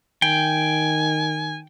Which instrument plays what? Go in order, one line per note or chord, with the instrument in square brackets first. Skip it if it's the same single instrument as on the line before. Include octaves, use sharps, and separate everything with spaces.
[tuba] D#3 [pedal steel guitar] G5 [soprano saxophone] G#5